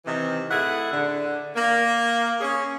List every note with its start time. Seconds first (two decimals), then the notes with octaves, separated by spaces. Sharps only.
0.05 C3 D#3 E3
0.51 A2 E4 G#4 F#5
0.92 D3
1.55 A#3
2.40 C#4 G#4